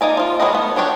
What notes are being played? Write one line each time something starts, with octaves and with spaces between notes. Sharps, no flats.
A#3 D#4 D5 G#5
F3 F4
F#3 F4 G#4 B4 D#5
A3 B3
F#3 D4 G4 C#5 D5